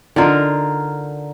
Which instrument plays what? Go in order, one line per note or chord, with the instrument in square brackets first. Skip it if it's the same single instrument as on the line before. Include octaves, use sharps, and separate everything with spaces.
[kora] D3 D#4 F4 A#4